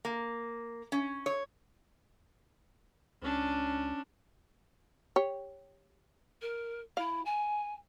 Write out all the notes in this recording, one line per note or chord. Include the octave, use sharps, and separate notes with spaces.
A#3
C#4
C#5
C#2 C#4 D4
G4 C#5
A#4
E4 F5
G#5